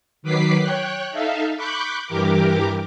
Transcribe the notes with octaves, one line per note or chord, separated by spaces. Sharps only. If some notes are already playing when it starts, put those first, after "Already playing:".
D#3 F#3 B4 D6 B6 C7
C#5 G5 F#6
D#4 A4 E5 F5
B5 C#6 D6 F#6 G6
G2 E3 G4 A#4 D6